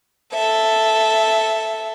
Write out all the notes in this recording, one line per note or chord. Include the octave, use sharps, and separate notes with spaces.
A4 E5